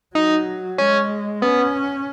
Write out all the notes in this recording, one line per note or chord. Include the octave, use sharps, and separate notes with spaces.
F#3 D#4
G#3 C#4
B3 C#4